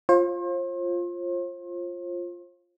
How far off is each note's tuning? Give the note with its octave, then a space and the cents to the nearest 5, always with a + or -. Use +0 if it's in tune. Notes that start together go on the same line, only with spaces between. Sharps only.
F4 +0 C5 +40